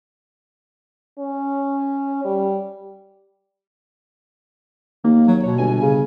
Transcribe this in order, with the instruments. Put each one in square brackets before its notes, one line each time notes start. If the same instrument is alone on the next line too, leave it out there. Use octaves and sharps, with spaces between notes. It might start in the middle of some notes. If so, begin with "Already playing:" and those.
[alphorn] C#4
G3
[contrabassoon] D#2 [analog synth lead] A#3
[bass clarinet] F#3
[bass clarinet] B2 [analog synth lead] C#5
[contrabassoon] G1 [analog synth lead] G#5
[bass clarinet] C#3